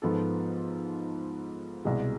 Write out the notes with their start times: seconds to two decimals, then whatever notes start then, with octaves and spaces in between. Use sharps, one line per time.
0.02 G#2 F3 B3 F4 A4
1.85 C2 B2 G#3